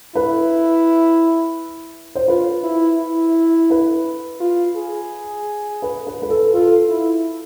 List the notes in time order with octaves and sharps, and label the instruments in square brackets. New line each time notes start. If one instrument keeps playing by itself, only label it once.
[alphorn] E4 [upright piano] B4
[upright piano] C5
[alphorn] F4 [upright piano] B4
[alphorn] E4
E4
[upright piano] B4
[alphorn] F4
G#4
[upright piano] B4
B4
B4
A4
[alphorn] F4 [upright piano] A4
[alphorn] E4